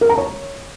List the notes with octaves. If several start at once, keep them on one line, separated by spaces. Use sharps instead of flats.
A#4
A#5
C#5